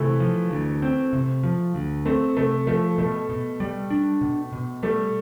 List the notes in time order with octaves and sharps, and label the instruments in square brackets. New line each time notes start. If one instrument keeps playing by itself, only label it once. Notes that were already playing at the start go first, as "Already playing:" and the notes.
Already playing: [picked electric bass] C3 [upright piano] E3 A3
[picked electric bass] F3
D2
C4
C3
F3
D2
[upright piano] A3 [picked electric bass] C4
[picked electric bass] C3 [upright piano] A3
[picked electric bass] F3 [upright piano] A3
[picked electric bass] B2 [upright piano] A3
[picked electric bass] B2
G3
D4
B2
B2
[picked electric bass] G3 [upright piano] A3